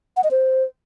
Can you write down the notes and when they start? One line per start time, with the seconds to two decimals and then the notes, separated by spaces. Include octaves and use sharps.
0.17 F#5
0.24 D#5
0.31 C5